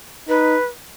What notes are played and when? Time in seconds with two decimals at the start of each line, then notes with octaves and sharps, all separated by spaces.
0.28 D#4 B4